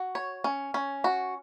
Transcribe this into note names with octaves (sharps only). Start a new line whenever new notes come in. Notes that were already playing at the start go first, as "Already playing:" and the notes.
Already playing: F#4
C#5
C#4
C#4
F#4